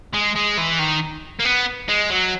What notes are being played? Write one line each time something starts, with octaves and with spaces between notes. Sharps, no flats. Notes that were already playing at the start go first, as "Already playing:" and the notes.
G#3
G#3
E3
D#3
A#3
B3
G#3
F#3